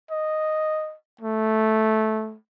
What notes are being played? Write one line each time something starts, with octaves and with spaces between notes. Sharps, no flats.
D#5
A3